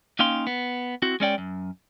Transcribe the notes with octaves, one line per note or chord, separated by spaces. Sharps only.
A#3 C#4 D#4 F5 G5 C6
B3
C4 E4 F#4
G#3 C#4 D5 G5
F#2